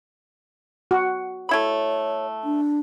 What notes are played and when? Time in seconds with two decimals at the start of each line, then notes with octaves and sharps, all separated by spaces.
0.91 F#4
1.49 A3 E4 C#5 B5
2.44 D4